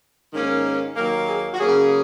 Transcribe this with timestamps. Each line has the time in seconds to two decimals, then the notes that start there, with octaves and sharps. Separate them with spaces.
0.33 G#2 D#3 A#3 C#4
0.96 D#2 D#3 F#3 A#3 A#4
1.28 G#4
1.54 F#4
1.59 C#3 F#3 A#3 C#4 G#4